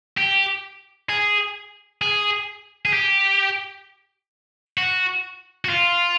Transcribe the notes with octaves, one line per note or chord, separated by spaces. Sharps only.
G4
G#4
G#4
G#4
G4
F#4
F#4
F4